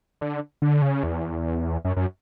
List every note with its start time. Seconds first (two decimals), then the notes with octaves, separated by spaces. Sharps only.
0.21 D3
0.62 D3
0.82 C#3
1.03 E2
1.85 F#2
1.96 F#2